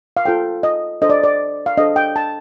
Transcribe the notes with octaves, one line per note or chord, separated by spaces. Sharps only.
F5
F4 A4 C5 G5
D#5
D4 A4 C5 D#5
D5
D5
F5
D4 A4 C5 D#5
G5
A5